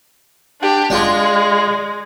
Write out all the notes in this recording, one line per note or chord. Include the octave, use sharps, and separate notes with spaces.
D4 G4
G#3 D4 F4